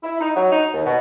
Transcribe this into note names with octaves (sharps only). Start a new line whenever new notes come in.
E4
D#4
F#3
D#4
D#2
B2